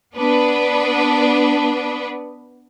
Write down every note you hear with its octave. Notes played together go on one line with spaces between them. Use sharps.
B3 D4 B4